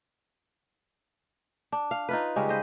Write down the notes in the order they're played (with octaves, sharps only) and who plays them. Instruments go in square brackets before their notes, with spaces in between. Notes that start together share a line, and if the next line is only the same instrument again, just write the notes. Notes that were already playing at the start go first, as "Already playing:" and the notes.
[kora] D4
F5
D#4 F4 B4
C#3 G3 G#3
B4 C5 D#5